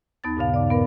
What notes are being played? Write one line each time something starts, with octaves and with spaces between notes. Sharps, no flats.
D#2 B3 D#4 A5 A6
G2 A#2 C#3 F5
D5 D6
B3 A#4 B4